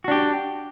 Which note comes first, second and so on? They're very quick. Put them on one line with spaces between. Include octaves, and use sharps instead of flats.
F#4 D4 G4